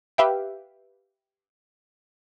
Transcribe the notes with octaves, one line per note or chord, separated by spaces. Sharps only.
G4 B4 E5 F5 G5